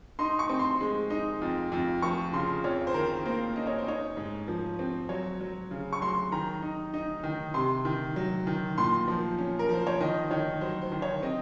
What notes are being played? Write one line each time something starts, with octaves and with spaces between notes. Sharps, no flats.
D#4 C6
C#6
C4
C6
G#3
D#4
F2
F2
F3 C#6
C#3 C6
F2 C#5
C5
D#3 A#4
A#3 C5
C#4 D#5
C#5
C5
D#4 C#5
G#2
F3
C4
F#3 C#5
F#3
C#3
C#6
F#3 C6
D#3 A#5
D#4
D#4
D#3
C3 C6
D#3
F#3
D#3
A#2 C6
F3
C#4
A#4
F3 C5
C#5
D#3 D#5
D#3 C#5
F#3 C5
C5
D#3
C#5
C4 D#5